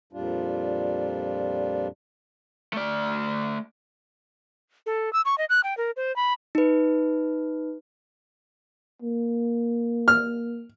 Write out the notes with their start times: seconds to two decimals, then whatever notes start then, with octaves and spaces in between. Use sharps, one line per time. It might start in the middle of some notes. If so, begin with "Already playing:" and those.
0.13 F2 A#2 G3 D4 F4
2.73 A3 D5
4.86 A4
5.13 E6
5.25 C#6
5.38 D#5
5.49 F#6
5.64 G5
5.77 A#4
5.97 C5
6.16 B5
6.55 D#4 B4
9.02 A#3
10.08 F6